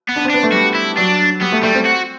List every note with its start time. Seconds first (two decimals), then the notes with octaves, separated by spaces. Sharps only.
0.09 B3
0.16 D4
0.25 C4
0.30 B3 D4
0.43 A3
0.52 G3 F#4
0.75 E4
0.97 F#3 D4
1.41 G3 B3
1.52 A3
1.63 G3 A3
1.75 C4
1.86 F#4